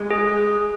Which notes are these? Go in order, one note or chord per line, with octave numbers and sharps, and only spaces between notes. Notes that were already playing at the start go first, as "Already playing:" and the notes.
Already playing: G#3
G#4